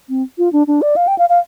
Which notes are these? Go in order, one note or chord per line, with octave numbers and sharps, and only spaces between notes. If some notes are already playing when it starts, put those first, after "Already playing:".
C4
F4
D4
D4
D5
F5
G5
F5
F5